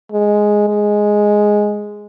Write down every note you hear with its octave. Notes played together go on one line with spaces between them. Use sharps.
G#3
G#3